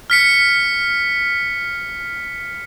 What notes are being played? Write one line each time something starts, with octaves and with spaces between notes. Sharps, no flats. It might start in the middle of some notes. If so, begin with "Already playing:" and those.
F6 B6 C#7